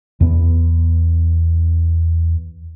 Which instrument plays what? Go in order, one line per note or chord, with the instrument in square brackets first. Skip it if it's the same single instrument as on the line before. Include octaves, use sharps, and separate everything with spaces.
[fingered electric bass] E2 B3